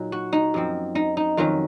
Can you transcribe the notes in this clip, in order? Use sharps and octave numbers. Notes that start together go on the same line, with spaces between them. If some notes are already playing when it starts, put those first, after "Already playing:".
Already playing: A#2 F#3 A#3 D#4
F#4
D#4
F#2 F3 C4
D#4
D#4
F2 D#3 F#3 C#4 F4